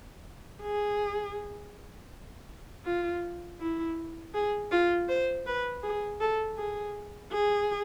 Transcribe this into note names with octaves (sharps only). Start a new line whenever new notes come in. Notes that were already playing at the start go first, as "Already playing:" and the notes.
G#4
F4
E4
G#4
F4
C5
B4
G#4
A4
G#4
G#4